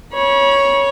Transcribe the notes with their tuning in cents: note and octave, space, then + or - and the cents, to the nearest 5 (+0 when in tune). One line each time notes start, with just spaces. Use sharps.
C#5 +0 B5 -40